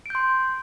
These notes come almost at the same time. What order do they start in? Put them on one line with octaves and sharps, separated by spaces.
D7 G6 C6